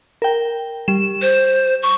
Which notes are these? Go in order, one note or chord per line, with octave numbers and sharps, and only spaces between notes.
A#4 G5
G3 E7
C5
C#6